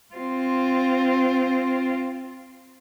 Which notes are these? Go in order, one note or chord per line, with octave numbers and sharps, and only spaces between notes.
C4 F4